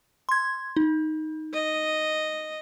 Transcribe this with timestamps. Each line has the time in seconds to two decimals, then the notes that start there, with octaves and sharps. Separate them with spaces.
0.29 C6 G#6
0.77 D#4
1.54 D#5